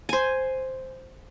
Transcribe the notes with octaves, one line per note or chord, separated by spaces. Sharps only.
C5 G#5